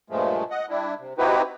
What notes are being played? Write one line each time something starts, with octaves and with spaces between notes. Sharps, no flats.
G2 A#2 F3 G#3 A3
D#5 F#5
G3 D4 E4
C3
C4 D#4 E4 F#4 G4 B4